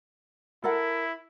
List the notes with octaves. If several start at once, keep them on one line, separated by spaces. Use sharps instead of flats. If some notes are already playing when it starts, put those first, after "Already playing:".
E4 A4 A#4 F#5